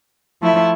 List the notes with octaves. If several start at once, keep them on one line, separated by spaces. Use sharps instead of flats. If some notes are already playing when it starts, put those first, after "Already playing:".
F3 A3 E4